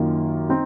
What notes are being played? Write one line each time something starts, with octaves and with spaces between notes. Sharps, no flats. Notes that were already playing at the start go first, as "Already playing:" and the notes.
Already playing: F#2 D#3 A#3 F4
C4 D#4